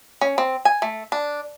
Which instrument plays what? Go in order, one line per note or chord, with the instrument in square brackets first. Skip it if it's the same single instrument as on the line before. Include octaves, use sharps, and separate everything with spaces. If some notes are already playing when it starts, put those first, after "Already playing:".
[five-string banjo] C#4
C4
G#5
A3
D4